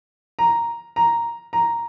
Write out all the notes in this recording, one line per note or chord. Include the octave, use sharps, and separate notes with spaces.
A#5
A#5
A#5